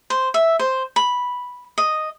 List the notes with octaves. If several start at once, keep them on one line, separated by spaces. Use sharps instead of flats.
C5
E5
C5
B5
D#5